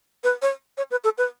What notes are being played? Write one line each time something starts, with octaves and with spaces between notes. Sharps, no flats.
B4
C#5
C#5
B4
A4
B4